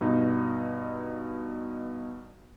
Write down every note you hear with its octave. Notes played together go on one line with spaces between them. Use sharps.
G2 B2 D#4